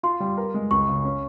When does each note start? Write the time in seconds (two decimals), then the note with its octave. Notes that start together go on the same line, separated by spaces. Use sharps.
0.03 F4 C6
0.20 G3
0.37 A#4
0.54 G#3
0.71 C#2 C#6
0.88 C#3
1.05 C#4